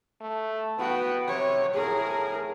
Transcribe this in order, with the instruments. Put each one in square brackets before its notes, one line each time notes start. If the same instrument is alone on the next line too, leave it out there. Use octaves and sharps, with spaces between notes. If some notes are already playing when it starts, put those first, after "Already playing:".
[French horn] A3
[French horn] B3 [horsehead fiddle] F#4 G5
[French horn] C3 [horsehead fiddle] C#5
[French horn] A2 [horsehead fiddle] G#4 A#4